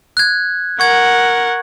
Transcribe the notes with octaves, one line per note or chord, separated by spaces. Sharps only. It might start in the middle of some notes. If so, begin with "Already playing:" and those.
F#6 G#6
A#4 F#5 C#6 G#6